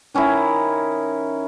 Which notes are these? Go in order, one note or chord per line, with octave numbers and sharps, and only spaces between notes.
D#3 C#4 D#4 E4